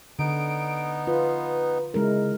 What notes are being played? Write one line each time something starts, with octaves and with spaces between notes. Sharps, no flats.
D3 B3 D#4 D7
F4 B4
C#3 G#3 E4 A#4